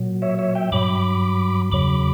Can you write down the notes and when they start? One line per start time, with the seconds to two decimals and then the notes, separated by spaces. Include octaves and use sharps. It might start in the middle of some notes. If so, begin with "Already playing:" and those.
Already playing: A#2 F#3
0.22 C#5 E5
0.39 C#5 E5
0.55 E5 G5
0.72 G2 F#3 B5 D6
1.72 E2 C#3 F#3 B5 D6